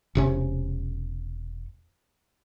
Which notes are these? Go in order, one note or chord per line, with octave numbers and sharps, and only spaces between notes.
E1 C3 C#4